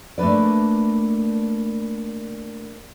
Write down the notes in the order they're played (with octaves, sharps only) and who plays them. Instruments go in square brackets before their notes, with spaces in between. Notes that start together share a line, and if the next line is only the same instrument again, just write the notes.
[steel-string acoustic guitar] A3 A#3 D4 B4 D5